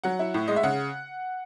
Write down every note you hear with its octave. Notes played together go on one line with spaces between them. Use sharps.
F#3 F#5
E4
A2
G#3 D#5
E5
C#3 F#5